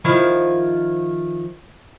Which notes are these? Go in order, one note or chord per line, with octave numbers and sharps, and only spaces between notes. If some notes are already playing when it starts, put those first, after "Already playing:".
D#3 F3 E4